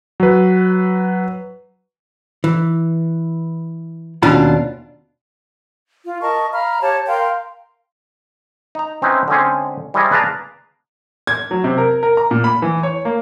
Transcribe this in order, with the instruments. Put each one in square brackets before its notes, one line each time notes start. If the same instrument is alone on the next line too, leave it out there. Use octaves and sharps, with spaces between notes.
[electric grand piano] F#3 B4
[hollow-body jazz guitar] E3
D#2 B2 C#4 D4 F4 B5
[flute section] F4
A#4 D#5 A5 C#6
F5 A#5 B5 F6
G4 C#5 A5
A#4 F5 G5 C6
[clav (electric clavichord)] D#4 A#5
C4 C#4 D#4 E4 B4 C5
D3 G#3 C4 C#4 G#4
G3 G#3 E4 C5 C#5 D#5
G#4 B4 D5 F5 A5 A#5
[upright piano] G#6
F#3
C3
A#4
A#4
A#5
A#2
B5
E3
C#5
A#3